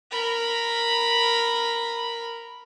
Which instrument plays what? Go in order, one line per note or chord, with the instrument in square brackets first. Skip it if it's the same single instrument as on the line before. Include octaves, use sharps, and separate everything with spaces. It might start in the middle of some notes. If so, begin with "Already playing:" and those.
[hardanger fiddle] A#4 B5